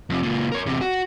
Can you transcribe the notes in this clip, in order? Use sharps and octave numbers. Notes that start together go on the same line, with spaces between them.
F2 C3
C#2 A#2
A#4 C#5
E2 C3
F#4